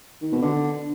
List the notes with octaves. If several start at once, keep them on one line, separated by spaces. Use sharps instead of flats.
D#3
B2
D3